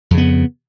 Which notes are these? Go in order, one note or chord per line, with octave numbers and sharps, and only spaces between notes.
F2 C#3 B3